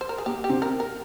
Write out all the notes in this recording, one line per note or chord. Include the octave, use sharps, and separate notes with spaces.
C5
A#4
G#4
A#3 G4
G4
C3 C4
A#4
A#4